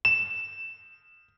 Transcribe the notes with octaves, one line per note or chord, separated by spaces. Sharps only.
E7